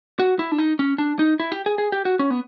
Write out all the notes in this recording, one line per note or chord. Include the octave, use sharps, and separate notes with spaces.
F#4
E4
D4
D#4
C#4
D4
D#4
E4
G4
G#4
G#4
G4
F#4
C#4
B3